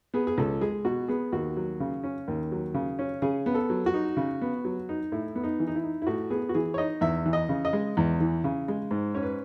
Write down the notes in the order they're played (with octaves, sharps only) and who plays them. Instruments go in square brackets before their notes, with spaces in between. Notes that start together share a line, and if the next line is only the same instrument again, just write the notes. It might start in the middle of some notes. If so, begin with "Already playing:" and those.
[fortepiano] B3 G#4
G#4
C#2 A4
G#3 G#4
B2 F#4
B3 G#4
D#2 F#4
F#3
C#3
C#4
D#2
F#3
C#3
C#4
C#3 G#4
B3
A4
F#3
F#4
D#4
C#3
B3
F#3
D#4
A2 E4
B3
D#4
E3
D#4
E4
D#4
E4
A2 F#4
B3 G#4
F#4
E3 G#4
C#5
D#4 D#5
E2 E5
E3
D#5
C#3
D#5
G#3
E2
E3
C#3
G#3
G#2
C#4 C#5
B4